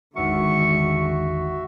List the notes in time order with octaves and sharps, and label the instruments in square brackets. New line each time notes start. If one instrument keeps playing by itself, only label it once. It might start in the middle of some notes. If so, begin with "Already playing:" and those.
[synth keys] G#1 E2 D#3 [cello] D3 G#3 [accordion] F#4 E5 [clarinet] C#6